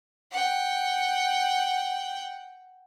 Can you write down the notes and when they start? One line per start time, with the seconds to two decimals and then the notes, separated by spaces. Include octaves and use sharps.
0.32 F#5 G5